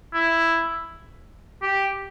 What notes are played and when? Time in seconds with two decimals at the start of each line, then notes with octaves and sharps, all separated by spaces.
0.14 E4
1.62 G4